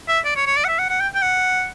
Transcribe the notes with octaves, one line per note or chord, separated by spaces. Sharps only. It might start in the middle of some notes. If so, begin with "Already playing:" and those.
E5
D5
C#5
C#5
D5
F#5
E5
F#5
F#5
G5
G5
F#5